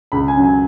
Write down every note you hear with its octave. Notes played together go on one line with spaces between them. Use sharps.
C#2 B5
G#5
C#3 F#3
G#5